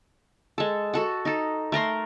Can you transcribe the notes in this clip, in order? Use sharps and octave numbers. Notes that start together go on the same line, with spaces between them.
G#3 A4
F#4 A4 F#5
D#4 A4
A3 A#4 A#5 C6